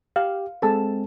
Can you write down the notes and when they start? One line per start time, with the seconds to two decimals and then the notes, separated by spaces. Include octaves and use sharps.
0.16 G4 F5
0.62 G#3 C4 G#4 A4 A5